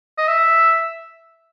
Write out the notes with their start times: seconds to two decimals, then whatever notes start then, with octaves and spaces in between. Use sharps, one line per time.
0.18 D#5
0.28 E5